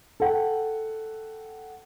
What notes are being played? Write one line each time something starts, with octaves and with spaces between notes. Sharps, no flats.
A4 F#5 G5